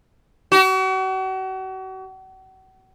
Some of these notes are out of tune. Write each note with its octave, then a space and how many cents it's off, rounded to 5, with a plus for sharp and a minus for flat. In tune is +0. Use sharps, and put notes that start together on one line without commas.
F#4 +40